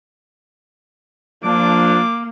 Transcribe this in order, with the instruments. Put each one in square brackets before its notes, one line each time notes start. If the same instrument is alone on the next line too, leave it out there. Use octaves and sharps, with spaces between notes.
[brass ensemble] F3 D4 [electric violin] A#3 [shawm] D6